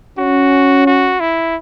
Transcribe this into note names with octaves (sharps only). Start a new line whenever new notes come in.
C#4 F#4
F#4
E4